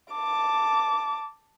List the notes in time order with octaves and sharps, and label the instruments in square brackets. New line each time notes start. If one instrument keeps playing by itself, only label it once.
[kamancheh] A5 D6